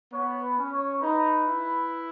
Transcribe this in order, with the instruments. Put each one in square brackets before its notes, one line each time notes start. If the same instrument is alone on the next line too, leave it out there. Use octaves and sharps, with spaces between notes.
[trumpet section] B3 [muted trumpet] C#5
[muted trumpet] B4
[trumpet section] C#4
[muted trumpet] C#5
[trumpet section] D#4 [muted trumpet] B4
[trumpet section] E4